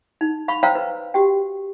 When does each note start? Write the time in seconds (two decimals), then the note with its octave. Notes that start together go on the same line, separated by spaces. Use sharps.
0.21 D#4
0.48 F5 B5 C#6
0.63 C5 C#5 F5 G5 A#5 E6
0.75 B4
1.14 F#4 G4 G5